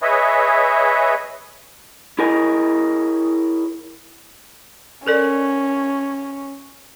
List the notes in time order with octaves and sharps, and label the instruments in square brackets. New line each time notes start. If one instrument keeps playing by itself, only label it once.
[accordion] G#4 B4 C#5 D#5 E5
[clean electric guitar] E4 G#4 A#4 C#5 D#5 G#5
[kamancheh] C#4 [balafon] A4 A#4 D5